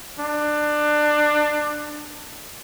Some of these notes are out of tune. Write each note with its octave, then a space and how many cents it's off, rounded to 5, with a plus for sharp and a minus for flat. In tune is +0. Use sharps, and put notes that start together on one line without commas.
D4 +25